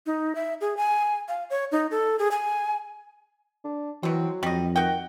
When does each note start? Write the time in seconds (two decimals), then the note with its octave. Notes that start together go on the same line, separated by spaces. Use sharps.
0.06 D#4
0.35 E5
0.61 G#4
0.77 G#5
1.28 F5
1.50 C#5
1.72 D#4
1.91 A4
2.19 G#4
2.31 G#5
3.64 D4
4.03 B2 E3 F#3 C4
4.43 F2 G3 D#5
4.76 D#3 F#4 D#5 G5